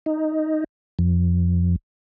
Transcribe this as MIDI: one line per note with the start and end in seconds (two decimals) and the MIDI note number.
0.06 0.64 63
0.99 1.76 41